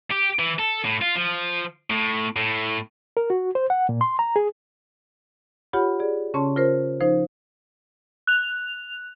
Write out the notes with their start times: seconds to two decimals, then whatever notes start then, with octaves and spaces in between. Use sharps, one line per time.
0.11 G4
0.39 E3
0.59 A4
0.85 A2
1.02 F4
1.16 F3
1.90 A2
2.36 A2
3.17 A#4
3.30 F#4
3.55 C5
3.70 F#5
3.89 A#2
4.01 C6
4.19 A#5
4.36 G#4
5.73 F4 G4 C#5 F#5 B5
6.00 G#4 D5
6.34 C#3 C#4 C#5 A5 C6 C#6
6.56 F4 A#4 C5
7.01 F3 D#4 C5
8.27 F#6 F7